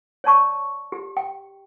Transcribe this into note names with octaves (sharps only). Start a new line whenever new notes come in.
C#5 D5 A5 C#6
G4
G5